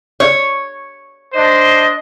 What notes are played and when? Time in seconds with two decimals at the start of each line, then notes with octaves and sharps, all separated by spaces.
0.20 C#5
1.33 D4 C5 D#5